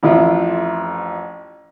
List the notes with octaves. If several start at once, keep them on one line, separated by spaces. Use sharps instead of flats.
A1 F2 E4 F4